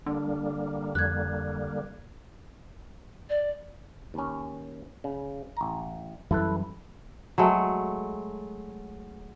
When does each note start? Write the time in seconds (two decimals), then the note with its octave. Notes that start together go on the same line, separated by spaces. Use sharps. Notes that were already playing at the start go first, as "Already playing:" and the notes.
0.06 D3 G3 A#3 D4
0.95 F2 F#6 G#6
3.30 D5
4.14 D#2 C#4
5.04 C#3
5.57 A1 A#5
6.31 F#2 E3 G3 E4 A4 B4
7.38 F#3 G#3 A3